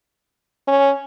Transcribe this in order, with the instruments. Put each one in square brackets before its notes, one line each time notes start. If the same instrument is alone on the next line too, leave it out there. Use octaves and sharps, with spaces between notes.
[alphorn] C#4